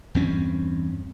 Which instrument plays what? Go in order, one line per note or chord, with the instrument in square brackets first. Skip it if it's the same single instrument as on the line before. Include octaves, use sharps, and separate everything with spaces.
[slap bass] E2 G2 C4 C#4